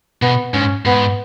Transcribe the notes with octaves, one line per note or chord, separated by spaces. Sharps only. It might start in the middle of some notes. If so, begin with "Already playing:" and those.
B2 B3
G#2 C#4
G#2 B3